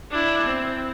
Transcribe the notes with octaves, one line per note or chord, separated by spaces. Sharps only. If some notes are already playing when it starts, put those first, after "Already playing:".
D4 E4
C4